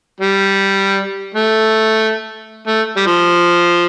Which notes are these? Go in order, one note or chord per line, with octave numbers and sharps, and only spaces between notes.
G3
A3
A3
G3
F3